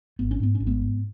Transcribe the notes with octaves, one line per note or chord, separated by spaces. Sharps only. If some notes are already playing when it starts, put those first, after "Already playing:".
G#1 B3
C#4
G#2 B3
C#4
G#1
G#3 B3
G#2